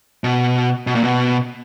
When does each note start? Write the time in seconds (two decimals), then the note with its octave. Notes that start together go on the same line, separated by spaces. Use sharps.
0.24 B2
0.87 B2
0.95 A#2
1.04 B2